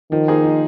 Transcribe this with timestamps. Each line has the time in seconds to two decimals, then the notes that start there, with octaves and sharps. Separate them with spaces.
0.11 D#3 F3
0.28 A#3 D#4 G#4 C5
0.44 F3